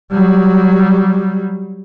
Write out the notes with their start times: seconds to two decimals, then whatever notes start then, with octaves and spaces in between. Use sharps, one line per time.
0.12 F#3 G3